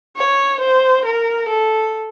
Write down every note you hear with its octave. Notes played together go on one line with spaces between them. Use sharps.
C#5
C5
A#4
A4